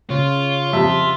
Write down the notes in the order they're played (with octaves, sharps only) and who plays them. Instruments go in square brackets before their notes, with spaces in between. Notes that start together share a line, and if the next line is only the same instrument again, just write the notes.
[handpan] C#3 [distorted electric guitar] F4 [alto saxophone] C#5
[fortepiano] F2 C3 G3 [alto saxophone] E5